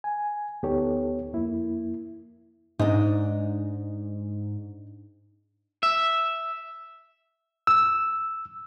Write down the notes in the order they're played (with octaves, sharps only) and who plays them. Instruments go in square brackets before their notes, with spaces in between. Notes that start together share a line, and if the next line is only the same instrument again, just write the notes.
[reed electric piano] G#5
D2 B3 D#4 G4 A4 C#5
F2 A#3 E4
[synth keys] G#2 [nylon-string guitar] D4 D#4
[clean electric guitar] E5
[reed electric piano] E6